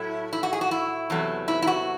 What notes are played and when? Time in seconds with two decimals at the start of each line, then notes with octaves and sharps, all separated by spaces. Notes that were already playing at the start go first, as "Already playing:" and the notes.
Already playing: A2 F#3 A3 E4
0.33 E4
0.43 F#4
0.53 G#4
0.61 F#4
0.71 E4
1.10 E2 C3 F#3 A3
1.48 E4
1.62 E4
1.67 F#4